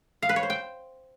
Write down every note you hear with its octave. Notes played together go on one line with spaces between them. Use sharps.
F5
B4
C#5
C5
G5